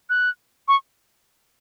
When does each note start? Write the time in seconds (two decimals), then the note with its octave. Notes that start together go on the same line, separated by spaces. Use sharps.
0.10 F#6
0.68 C#6